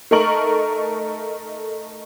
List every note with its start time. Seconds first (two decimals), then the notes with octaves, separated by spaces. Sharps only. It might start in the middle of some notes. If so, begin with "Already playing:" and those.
0.11 A3 D#4 A4 A#4 C#6 F#7